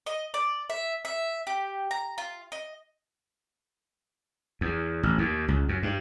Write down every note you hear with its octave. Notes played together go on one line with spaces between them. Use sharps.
D#5
D5
E5
E5
G4
A#5
F4
D#5
E2
A1
D#2
C#2
F#2
G2